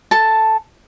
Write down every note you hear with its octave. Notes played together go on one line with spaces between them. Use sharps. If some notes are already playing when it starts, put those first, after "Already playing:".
A4 A5